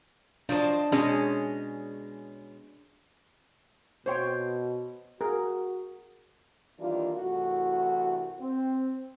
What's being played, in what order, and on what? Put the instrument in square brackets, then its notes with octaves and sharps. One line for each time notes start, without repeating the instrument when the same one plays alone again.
[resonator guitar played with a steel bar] F3 F#3 C5 [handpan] D4 [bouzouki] D5 D#5 A5
[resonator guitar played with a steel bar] B2 G#3 C#4 [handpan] D4 G#4 C#5
[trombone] B2 [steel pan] C5 C#5 G5
[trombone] F#4 [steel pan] G#4 A#4
[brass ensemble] D#3 E3 G3 A#3 D4 F4
C2 E3 A3 F#4
C4